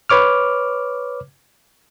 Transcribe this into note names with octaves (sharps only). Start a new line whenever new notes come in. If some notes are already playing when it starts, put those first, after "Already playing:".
B4 C#5 D6 F6